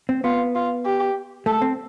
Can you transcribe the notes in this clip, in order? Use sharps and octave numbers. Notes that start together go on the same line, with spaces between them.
C4
B3 F4
F4
G4
A3 A4
C4